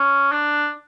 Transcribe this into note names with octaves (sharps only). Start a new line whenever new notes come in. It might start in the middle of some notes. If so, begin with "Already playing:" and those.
Already playing: C#4
D4